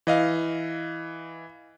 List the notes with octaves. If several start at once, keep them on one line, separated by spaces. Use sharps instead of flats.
E3 D#5 F5